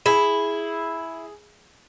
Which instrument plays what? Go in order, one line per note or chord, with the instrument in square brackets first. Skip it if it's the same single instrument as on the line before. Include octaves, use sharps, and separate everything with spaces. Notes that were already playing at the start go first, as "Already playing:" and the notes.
[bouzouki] E4 [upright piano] G#4